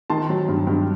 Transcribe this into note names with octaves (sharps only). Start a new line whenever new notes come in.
D#3 A5 C6
F#3
G2
G2